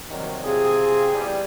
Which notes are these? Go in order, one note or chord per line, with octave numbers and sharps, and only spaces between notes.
C3 D#3 F#3 G3
C3 F4 G#4
E2 G3